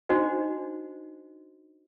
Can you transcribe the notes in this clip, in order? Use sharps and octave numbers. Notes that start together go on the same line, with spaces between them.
D4 D#4 F#4 C5 D#5